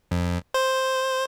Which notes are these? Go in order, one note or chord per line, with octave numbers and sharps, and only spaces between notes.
F2
C5